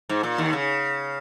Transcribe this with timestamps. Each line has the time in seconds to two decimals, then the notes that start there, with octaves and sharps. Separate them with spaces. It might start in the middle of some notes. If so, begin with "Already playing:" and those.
0.09 G#2
0.23 A#2
0.38 D#2 D#3
0.53 C#3